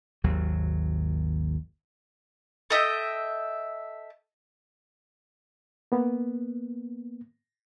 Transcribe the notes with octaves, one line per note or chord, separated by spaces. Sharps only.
G#1 D#2 F#3
A4 D#5 E5 G5
A#3 B3